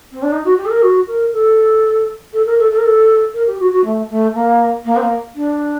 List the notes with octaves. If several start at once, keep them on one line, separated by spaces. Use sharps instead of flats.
C4
D4
D#4
F#4
G4
A4
A#4
F#4
A#4
A4
A4
A#4
A4
A4
A#4
A4
A#4
G4
F#4
F#4
A3
A3
A#3
A#3
C4
A#3
D4